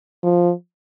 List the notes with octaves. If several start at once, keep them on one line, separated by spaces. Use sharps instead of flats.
F3